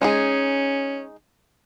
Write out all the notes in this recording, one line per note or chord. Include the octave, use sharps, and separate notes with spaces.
G#3 C#4 D#4 G#4